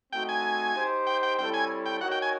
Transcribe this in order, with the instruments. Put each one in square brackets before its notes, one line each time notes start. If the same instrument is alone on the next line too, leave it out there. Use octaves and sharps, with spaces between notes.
[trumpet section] A3 C4 D#4 F#4 [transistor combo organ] G5
[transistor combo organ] G#5
[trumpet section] D#4 G4 C5
[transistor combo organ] G5
G5
[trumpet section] G3 C4 E4 A4 C#5 [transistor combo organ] G5
[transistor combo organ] G#5
G5
[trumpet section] D#4 F#4 A#4 C#5 [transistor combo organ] F#5
[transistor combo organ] G5
G#5